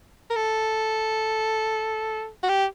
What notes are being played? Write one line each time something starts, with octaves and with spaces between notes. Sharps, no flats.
A#4
A4
F#4
G4